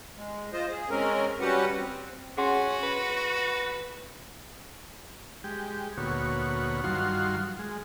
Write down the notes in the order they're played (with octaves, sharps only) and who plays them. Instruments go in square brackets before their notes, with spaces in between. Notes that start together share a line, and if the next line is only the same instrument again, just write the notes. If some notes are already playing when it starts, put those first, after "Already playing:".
[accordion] G#3
F4 C5 D#5
G#4
G#3 C4 C#4 A#4
G3 C#4 F#4 G4 B4 F#5
C4
[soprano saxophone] C#4 [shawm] F#4 [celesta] G#4 F#5 C6
[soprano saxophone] B4
[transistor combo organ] G#3 G4
D2 A#2 B3 F#4 C#5
G2 D#3 F#3 F4 F#4 C6
G#3